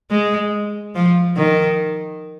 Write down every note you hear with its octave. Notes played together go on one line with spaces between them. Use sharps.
G#3
F3
D#3